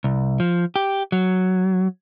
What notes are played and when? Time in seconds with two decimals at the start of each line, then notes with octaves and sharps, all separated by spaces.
0.04 C2
0.40 F3
0.76 G4
1.12 F#3